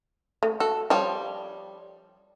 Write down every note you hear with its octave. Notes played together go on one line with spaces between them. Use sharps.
A3
F#4 A4
F3 G3 C#5 G5 A5